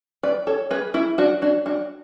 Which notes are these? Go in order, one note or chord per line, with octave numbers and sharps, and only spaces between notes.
B4 D5
A4 C#5
G#4 B4
E4 G#4
D4 F#4
D4 F#4
D4 F#4